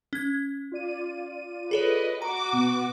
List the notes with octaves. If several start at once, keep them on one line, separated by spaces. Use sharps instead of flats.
C#4 G#6
F4 D5 D#7
G#4 A4 B4 C#5 D#5
F#4 A#5 D6
B2 B3